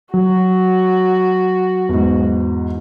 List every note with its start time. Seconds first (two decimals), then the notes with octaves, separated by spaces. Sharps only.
0.14 F#3 F#4
1.89 E2 G#2